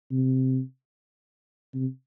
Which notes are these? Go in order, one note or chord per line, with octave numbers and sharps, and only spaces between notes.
C3
C3